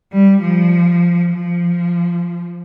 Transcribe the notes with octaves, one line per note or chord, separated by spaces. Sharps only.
G3
F3
F3